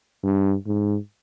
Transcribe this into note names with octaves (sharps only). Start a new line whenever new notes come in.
G2
G#2